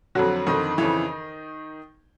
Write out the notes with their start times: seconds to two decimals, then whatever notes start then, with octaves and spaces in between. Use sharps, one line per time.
0.15 F2 D3 F#3 F#4
0.46 F2 D3 D#3 D#4
0.78 F2 C#3 E3